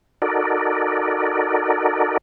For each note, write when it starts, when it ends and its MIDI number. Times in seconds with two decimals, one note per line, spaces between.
0.22 2.17 63
0.22 2.17 66
0.22 2.17 69
0.22 2.17 70
0.22 2.17 74